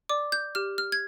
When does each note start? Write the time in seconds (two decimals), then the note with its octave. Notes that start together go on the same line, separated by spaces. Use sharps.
0.09 D5 D6
0.32 G6
0.55 G4 F6
0.78 F6
0.92 G#6